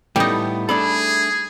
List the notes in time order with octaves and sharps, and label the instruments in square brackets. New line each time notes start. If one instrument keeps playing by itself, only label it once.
[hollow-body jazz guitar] A2 A3 B3 [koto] G3 D#4 [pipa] G5
[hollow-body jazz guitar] A3 D4 A4 [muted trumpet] G#4 [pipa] B5